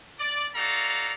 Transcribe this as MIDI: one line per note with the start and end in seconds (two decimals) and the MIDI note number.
0.20 0.48 74
0.55 1.13 63
0.55 1.13 66
0.55 1.13 69
0.55 1.13 74
0.55 1.13 77
0.55 1.13 82